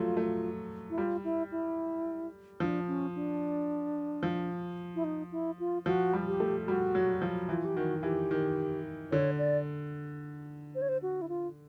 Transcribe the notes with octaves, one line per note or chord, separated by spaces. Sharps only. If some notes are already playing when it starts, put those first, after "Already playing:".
Already playing: F3 F#3 A3 F4
A3
E4
G3 F4
E4
E4
F3 D4
C#4
D4
F3
E4
D#4
E4
F4
F3 F#4
G3
G4
A3
G3 F#4
F#3
F3
E3 F4
G4
D#3 F#4
E3 G4
D#3
D3 C#5
D5
C5
C#5
C5
F#4
E4
F4